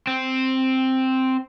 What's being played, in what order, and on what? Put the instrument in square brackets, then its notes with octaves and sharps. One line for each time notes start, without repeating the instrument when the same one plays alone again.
[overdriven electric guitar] C4